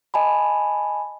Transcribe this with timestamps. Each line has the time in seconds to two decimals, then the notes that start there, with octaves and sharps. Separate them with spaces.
0.14 D#5 G#5 A5 B5